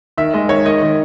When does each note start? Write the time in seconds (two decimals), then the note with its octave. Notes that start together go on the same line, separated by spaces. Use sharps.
0.18 D#3 E5
0.34 G#3 D#5
0.49 D#3 C#5
0.65 D#3 D#5
0.82 D#3